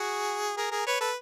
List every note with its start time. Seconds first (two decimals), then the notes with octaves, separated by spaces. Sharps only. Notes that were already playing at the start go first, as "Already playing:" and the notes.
Already playing: F#4 G#4
0.57 G#4 A#4
0.71 G#4 A#4
0.86 B4 C#5
1.00 A4 B4